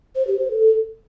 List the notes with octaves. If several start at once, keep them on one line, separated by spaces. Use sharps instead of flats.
C5
G4
C5
A4